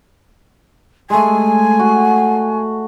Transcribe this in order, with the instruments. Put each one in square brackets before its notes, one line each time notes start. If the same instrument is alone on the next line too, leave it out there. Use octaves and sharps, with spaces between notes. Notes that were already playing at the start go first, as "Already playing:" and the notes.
[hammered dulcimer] G#3 A3 [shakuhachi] G#5
[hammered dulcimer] F#4